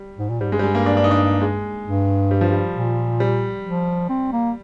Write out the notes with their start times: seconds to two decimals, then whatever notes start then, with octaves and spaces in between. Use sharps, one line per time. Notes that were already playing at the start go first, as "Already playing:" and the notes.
Already playing: G3
0.18 G#2
0.30 A#2
0.41 G#2 G3
0.52 G2 G#3
0.59 G3
0.63 G#3
0.75 A#3
0.86 D4
0.97 D4
1.04 D#4
1.11 D4
1.42 G#3
1.86 G2
2.31 G3
2.41 F3
2.52 G3
2.75 A#2
3.20 G3
3.66 F3
4.09 C4
4.32 A#3